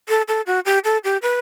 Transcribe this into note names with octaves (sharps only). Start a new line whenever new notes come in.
A4
A4
F#4
G4
A4
G4
B4